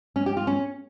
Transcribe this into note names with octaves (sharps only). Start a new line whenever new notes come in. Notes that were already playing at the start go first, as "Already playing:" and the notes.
C#4
G4
F4
C#4